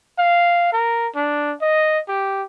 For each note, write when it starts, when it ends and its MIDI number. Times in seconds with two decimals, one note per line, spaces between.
0.19 0.68 77
0.73 1.08 70
1.16 1.53 62
1.62 1.99 75
2.09 2.43 67